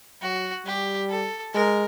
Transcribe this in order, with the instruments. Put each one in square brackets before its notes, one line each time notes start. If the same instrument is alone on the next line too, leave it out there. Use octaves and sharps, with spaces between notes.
[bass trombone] F#3 [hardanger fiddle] F#4
[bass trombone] G3 [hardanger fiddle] G4
[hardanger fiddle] A4
[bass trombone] G#3 [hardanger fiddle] A#4